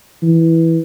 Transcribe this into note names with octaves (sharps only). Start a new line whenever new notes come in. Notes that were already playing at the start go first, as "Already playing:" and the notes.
E3